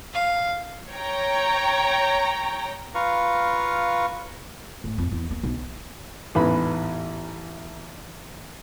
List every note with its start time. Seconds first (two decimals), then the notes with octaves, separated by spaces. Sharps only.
0.14 F5
0.93 C#5 G5 A#5
2.95 F4 B4 F5 A#5 C#6
4.84 A2
4.98 F2
5.12 E2
5.31 A#3
5.43 B1
6.35 A1 E2 G#2 B3 B5